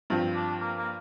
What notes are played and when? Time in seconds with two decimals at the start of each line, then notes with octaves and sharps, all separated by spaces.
0.10 G2 F3 C4 F4
0.35 D4
0.60 A#3
0.77 A#3